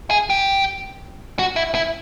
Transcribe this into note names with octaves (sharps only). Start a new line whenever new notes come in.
G#4
G4
F#4
E4
E4